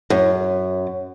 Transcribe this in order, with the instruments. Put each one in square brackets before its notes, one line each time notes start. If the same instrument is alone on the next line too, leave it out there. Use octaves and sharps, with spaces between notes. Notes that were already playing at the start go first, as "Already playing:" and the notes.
[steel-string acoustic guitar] F#2